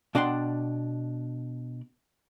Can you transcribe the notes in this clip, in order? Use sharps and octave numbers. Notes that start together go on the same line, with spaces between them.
B2 D4 D5 F#5 G5 C6